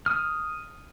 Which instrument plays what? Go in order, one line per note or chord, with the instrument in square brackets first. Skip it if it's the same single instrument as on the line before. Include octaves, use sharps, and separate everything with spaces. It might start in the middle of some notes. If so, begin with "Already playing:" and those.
[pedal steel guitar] D#6 F6